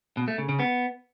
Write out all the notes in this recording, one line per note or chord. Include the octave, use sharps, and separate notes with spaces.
B2
A3
C#3
C#3
B3